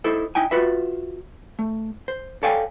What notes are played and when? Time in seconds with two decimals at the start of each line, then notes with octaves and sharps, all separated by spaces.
0.04 D#4 E4 A4 C5
0.35 D#4 E4 G5 G#5
0.51 F4 F#4 B4 E5
1.59 A3
2.08 C5
2.43 A4 C#5 D5 F5 G5 G#5